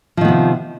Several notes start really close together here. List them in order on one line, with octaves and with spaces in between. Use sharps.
F3 D#3 B3 C3